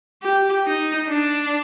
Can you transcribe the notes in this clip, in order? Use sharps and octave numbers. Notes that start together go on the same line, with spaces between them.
G4
D#4
D4